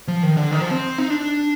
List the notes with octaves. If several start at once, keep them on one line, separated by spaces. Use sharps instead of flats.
F3
D#3
D3
D#3
F3
C4
D#4
D4